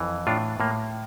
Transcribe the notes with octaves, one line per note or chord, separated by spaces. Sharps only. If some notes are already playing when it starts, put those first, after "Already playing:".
Already playing: F2 E3
A2 D4 F4
A2 A#3